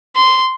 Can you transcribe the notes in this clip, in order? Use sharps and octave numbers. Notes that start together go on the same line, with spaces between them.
C6